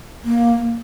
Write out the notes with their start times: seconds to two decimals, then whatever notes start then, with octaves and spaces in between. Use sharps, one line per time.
0.24 A#3